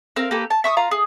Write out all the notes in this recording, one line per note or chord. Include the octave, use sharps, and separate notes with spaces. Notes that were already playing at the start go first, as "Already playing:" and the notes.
C4 A#4 F5
A#3 G4 A4 B4
A5
E5 C#6 D#6
F4 F5 A#5
G#4